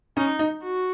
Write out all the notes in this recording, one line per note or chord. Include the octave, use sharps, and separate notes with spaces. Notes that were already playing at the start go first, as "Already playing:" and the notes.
C#4 D#4
D#4
F#4